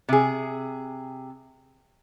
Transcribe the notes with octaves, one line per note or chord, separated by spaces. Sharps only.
C3 G#4